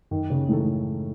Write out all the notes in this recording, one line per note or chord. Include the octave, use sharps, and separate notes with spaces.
F#2 D#3
C#3
A2 E3 G#3 D#4 A4